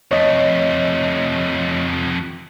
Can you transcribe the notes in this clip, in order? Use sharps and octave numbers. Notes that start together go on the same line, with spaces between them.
F2 A3 C#5 D#5